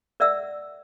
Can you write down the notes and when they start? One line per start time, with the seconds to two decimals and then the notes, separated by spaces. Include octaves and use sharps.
0.20 A#4 D5 E5 F#5 E6